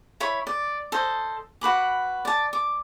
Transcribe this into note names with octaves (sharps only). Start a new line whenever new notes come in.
E4 C#5 B5
D5
A4 C5 D#5
F#4 B4 B5 D6
D5 A5
D6